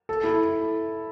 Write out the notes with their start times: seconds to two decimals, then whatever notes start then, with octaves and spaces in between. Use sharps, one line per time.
0.09 A4
0.24 E4